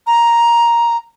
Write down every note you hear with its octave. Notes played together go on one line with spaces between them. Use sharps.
A#5